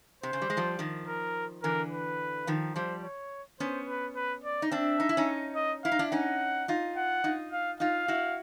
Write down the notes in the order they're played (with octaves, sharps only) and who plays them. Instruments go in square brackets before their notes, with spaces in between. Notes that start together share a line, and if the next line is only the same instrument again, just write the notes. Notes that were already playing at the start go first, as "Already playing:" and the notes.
[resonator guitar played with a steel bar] C3 [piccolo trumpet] C5
[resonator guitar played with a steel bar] C#3
G3
G#3
F3 G3
D#3 F3
[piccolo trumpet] A#4
[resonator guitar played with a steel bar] D3 E3 [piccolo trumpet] A#4
[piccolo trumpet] B4
[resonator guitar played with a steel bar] D#3 F3
[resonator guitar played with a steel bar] F3 G3 [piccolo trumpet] C5
[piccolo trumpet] C#5
[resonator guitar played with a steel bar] B3 C#4 [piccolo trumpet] C5
[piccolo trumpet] B4
B4
D5
[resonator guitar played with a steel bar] D#4
[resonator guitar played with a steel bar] C4 D4 [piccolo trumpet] E5
[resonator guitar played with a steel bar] D#4
E4
C#4 D#4
[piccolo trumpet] D#5
[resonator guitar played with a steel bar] E4 [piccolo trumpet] F5
[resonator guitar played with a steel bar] D#4
D4 E4
[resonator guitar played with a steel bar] C#4 D#4 [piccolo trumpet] F#5
[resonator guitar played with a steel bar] D#4 F4
[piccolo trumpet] F#5
[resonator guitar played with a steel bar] D#4 F4
[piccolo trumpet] F5
[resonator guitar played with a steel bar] D#4 F4 [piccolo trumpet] F5
[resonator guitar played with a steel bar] E4 F#4